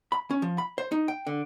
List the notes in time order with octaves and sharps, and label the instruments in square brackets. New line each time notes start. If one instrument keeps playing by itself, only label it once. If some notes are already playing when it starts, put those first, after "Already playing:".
[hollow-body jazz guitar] B5
C#4
F3
B5
C5
D#4
G5
D3